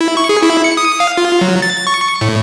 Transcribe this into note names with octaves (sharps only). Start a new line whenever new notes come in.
E4
C#6
G#4
E4
C#7
D#6
F5
F4
F#3
A6
C#6
A2